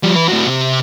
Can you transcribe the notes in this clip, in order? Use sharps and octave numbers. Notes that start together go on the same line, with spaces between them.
F3 G3
E3 B4
A2 F#4
C3